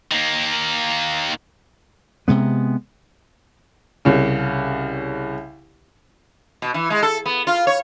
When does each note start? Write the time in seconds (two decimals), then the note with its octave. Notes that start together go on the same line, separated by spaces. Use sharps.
0.12 D#3 A#3
2.28 C3 G#3 B3
4.05 C2 C#3
6.62 B2
6.74 E3
6.90 G#3
7.03 A4
7.26 B3
7.47 F4
7.67 C#5